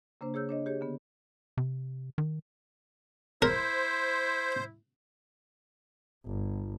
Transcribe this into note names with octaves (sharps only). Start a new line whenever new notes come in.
C#3 A#3 D4 C5
G#4 C#5 E6 G6
D4 C#5 D#5
G4 G#4 C#5
D3 B3
C3
D#3
E4 A#4 C5
G1